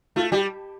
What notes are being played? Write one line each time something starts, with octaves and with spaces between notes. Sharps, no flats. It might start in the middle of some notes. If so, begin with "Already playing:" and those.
A3 F4
G3 G4